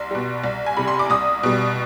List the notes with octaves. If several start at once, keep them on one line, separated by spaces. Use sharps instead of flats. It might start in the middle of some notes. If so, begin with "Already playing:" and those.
Already playing: C2 C6
B2 G3
C2
G#5
C3 G3 B5
C6
D6
C2 D#6
B2 G3